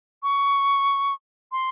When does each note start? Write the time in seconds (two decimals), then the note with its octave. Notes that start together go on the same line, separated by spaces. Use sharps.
0.23 C#6
1.52 C6